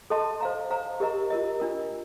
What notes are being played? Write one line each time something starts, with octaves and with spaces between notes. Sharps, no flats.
A4 D#5 A5 C6
C5 F5 A#5
C5 F5 A#5
G4 A#4 D#5 A#5
F4 A#4 D#5
D4 F4 A#4